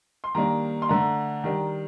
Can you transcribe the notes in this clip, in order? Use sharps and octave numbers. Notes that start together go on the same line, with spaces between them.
C6
D#3 G3 A#3 D4 A#5
C6
D3 A3 D4 A#5
D#3 G3 D4